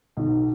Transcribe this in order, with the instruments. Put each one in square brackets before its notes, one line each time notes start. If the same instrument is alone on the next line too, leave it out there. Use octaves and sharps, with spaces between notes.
[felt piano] B1